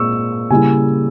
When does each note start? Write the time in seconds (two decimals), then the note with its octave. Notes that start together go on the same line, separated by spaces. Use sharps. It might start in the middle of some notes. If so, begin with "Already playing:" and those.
Already playing: A#2 G#3 C4 C#6 E6
0.50 C#3 G3 A#3 E4 G#5